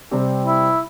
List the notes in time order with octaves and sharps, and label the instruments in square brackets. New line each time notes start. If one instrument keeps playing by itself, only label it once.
[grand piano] C3 G3 C4 G4
[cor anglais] E4